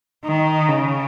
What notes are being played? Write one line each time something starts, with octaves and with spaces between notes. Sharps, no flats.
D#3
C#3